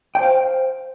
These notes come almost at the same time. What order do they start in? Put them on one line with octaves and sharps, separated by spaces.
G5 C5 F5